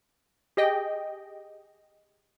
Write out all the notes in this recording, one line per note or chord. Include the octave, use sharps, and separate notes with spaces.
G4 G#4 D#5 G5